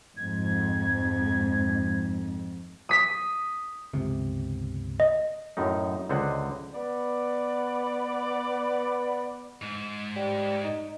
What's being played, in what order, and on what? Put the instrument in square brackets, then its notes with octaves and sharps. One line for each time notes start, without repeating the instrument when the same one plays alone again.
[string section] F2 G#2 [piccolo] G#6
[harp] D#6 B6
[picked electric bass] G1 C#2 C3
[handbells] D#5
[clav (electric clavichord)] F#2 A2 D#4
C#2 D3 C5 D#5 F#5
[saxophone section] B3 D5
[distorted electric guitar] G#2
[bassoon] G3
D#4